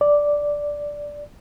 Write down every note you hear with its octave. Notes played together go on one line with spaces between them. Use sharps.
D5